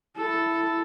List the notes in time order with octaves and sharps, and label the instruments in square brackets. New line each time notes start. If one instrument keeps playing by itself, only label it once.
[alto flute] E4 [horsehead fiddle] A4